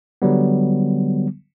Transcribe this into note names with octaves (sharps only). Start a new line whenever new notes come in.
D3 F#3 G3 B3